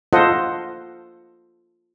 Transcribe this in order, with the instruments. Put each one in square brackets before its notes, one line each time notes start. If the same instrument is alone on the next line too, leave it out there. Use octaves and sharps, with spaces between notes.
[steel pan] F4 A4 C5 D#5 F#5